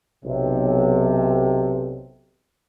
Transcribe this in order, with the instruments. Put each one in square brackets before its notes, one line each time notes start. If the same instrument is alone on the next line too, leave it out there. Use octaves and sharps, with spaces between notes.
[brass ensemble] B1 C3